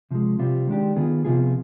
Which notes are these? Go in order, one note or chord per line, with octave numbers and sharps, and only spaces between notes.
C3 F3 G#3
C3 G3 C4 F4
D#3 G#3 D4 G4
D#3 B3 F4 G#4
C3 F3 B3 F4 G#4